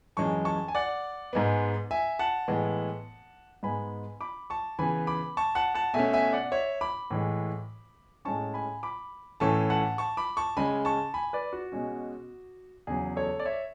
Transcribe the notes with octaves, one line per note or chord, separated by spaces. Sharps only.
F#2 E3 G#3 C#4 A5 C#6
A5 C#6
G#5
D5 F#5
G#2 G#3 B3
E5 G#5
F#5 A5
A2 E3 G#3 B3
G#2 G#3 B3 G#5 B5
B5 D6
A5 C#6
C#3 E3 B3 G#5 B5
B5 D6
A5 C#6
F#5 A5
F#5 A5
B2 A3 C#4 E5 G#5
E5 G#5
D5 F#5
C#5 E5
B5 D6
A2 E3 G#3
A2 G#3 C#4 A5 C#6
G#5 B5
B5 D6
A2 E3 A3 C#4 A5 C#6
F#5 A5
A5 C#6
B5 D6
A5 C#6
C#3 G#3 C#4 G#5 B5
A5 C#6
G#5 B5
B4 D5
F#4
B2 G#3 C#4
E2 C#3 F#3 G#4
A4 C#5
D5
C#5 E5